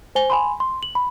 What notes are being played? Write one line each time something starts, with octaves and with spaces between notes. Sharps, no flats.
C5 G#5 G7
G#5 B5 C6
C6
F#7
B5